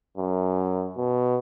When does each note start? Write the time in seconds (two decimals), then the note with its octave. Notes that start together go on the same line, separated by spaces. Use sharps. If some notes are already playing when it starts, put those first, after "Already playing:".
0.17 F#2
0.97 B2